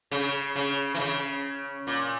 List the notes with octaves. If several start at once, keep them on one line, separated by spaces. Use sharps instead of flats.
C#3
C#3
E3
C#3
A#2